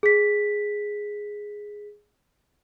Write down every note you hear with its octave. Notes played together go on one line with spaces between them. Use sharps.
G#4 B6